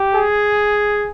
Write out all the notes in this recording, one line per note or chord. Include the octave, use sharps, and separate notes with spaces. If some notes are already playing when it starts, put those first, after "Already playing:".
Already playing: G4
G#4